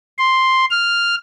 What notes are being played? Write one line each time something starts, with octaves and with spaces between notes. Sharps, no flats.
C6
F6